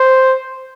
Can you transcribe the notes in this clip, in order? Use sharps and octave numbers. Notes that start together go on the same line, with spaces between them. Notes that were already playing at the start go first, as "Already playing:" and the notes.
Already playing: C5